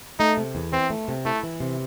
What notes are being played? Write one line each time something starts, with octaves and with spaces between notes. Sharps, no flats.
A3 D#4
C3
E2
E3 C4
A3
C3
A3 E4
E3
C3